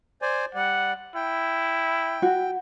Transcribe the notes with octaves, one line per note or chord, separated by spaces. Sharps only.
C5 D5 G#5
G3 D5 F#5
E4 G5
F#4